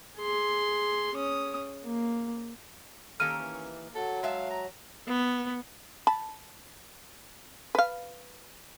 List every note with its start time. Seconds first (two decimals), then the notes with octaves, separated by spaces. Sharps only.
0.18 G#4 C6
1.15 C#4 D#6
1.84 A#3
3.20 D#3 A#3 C#4 G4 A4 F6 D#7
3.38 E3
3.95 F#3 A4
4.23 G#3 E5 F5 A5
4.50 A#5
5.08 B3
6.07 A5 B5
7.75 B4 F5